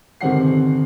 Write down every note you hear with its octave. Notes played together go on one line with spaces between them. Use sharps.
G1 C3 D#3 C4 F#5 C7